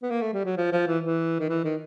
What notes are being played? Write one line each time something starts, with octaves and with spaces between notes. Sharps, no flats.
B3
A#3
A3
G3
F#3
F3
F3
E3
E3
D#3
E3
D#3